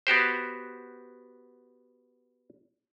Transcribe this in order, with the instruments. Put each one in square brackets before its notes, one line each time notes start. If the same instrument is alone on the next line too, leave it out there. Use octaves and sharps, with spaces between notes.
[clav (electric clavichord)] B3 F#4 G4 C5